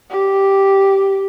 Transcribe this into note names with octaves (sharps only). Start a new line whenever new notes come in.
G4